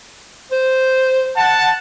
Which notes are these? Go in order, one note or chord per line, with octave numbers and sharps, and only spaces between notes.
C5
F#5 A5